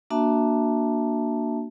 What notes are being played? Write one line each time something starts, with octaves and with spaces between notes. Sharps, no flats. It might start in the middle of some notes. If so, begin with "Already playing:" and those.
A#3 D4 F#4 E5 A5